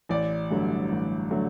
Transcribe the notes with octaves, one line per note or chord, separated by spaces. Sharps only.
A1 D5
G2 D3 F#3 A3
A1
D3 F#3 A3